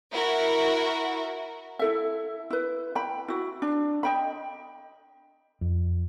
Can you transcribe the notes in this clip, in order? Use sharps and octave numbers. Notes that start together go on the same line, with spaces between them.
E4 F#4 A#4
E4 A4 E5
E4 B4
G5 B5
E4 F#4
D4
D#5 G5 B5
F2